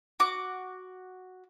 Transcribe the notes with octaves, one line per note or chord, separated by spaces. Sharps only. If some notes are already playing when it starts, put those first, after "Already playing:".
F#4 D6